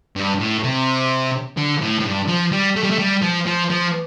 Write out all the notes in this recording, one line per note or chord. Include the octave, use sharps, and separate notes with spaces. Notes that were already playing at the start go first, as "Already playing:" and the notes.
G2
A2
C3
D3
A2
A2
G2
F3
G3
A3
G3
A3
G3
F3
F3
F3